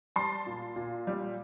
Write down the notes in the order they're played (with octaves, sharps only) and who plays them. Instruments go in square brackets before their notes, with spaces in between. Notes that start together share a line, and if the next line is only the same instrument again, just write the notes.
[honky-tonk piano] G3 A5 C6
A#2
A#2
G3